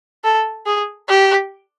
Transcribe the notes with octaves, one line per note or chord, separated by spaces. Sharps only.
A4
G#4
G4